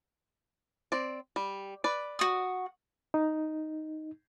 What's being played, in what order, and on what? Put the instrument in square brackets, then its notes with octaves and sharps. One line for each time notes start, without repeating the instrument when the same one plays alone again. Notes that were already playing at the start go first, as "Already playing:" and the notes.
[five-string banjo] C4 D5
G3
B4 D5
[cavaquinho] F#4 D#6
[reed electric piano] D#4